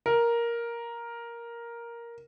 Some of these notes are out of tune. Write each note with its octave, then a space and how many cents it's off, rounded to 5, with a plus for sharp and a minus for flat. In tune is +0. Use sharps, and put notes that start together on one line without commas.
A#4 +5